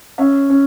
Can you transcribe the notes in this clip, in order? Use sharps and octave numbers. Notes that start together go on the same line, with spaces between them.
C#4 E5
C#4